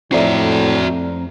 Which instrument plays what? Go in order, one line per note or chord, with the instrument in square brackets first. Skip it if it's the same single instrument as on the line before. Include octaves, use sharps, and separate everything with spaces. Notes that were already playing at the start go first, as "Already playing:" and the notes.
[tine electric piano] F2 A#5 C7 [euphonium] A2 [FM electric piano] C4 D5 [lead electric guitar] F#4 E5